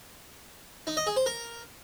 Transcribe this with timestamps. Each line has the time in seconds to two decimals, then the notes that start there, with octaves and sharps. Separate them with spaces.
0.87 D#4
0.97 D#5
1.07 G#4
1.16 C5
1.26 A#4